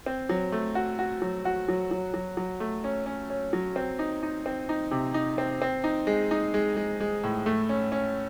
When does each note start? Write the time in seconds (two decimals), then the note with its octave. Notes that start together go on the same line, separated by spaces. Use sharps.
0.06 C4
0.29 F#3
0.52 A3
0.75 F#4
0.99 F#4
1.22 F#3
1.45 F#4
1.68 F#3
1.91 F#3
2.14 F#3
2.37 F#3
2.60 A3
2.84 C#4
3.06 C#4
3.30 C#4
3.53 F#3
3.76 C4
3.99 D#4
4.23 D#4
4.46 C4
4.69 D#4
4.91 C3
5.14 D#4
5.38 C4
5.62 C4
5.84 D#4
6.07 G#3
6.31 D#4
6.54 G#3
6.77 G#3
7.00 G#3
7.23 A2
7.46 A3
7.69 C#4
7.92 C#4